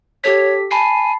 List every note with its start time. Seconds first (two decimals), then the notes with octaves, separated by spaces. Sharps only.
0.24 G4 A4 C#5 B6
0.71 G#5 A5 B5 C7